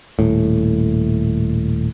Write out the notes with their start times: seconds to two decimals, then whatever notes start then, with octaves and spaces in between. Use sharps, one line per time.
0.19 D#1 A2